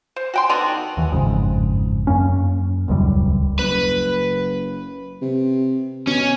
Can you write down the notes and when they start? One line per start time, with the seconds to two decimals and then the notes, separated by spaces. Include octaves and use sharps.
0.16 C5
0.34 F#4 G5 C6
0.49 D3 B3 D#4 F#4
0.97 D#2 E3
1.12 G1 F2 G#2 C#3
2.07 F#2 A#3 C#4
2.88 D#1 C#2 F#2 G3
3.59 F#1 B4
5.22 C3
6.07 B2 C#4